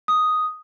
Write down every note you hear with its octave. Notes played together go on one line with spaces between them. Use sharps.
D#6